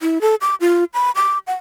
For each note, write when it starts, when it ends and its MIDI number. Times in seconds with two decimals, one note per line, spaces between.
0.01 0.21 64
0.21 0.35 69
0.41 0.55 86
0.61 0.84 65
0.94 1.11 83
1.16 1.38 86
1.47 1.54 78